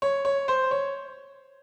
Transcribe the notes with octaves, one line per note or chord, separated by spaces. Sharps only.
C#5
C#5
C5
C#5